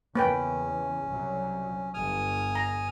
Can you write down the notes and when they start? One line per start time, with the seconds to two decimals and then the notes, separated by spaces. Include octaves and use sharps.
0.15 E2 C#3 A#3 C#4 B4 G5
1.07 C2 C3 F#3
1.94 G1 G#5 D#6 F6
2.55 A#5